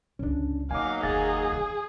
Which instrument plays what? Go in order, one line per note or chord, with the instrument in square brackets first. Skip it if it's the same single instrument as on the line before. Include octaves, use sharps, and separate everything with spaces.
[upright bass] G1 C#2 [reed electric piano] C#4 D4
[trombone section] F#3 A#3 D#4 [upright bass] B3 [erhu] F5 [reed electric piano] G#5 D6
[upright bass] F#1 [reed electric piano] D#2 F5 A6 [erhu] G#4
[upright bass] E3 C4